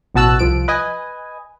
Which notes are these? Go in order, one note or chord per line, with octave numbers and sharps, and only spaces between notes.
A1 B2 F#4 A5 E6 F#6
C2 F3 D7
B4 D#5 G#5